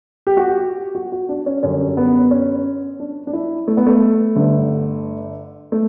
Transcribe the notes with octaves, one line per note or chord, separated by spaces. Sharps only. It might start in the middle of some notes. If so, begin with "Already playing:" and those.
G4
F#4
G4
F#4
F#4
D4
C#4
F#2 D3 G3 C#4
B3
C#4
D4
D4
E4
A3
B3
A3
G1 G2 D3
A3